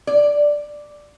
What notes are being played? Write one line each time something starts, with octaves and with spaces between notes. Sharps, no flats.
D5